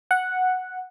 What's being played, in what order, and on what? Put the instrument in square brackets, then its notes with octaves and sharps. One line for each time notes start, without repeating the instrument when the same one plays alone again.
[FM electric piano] F#5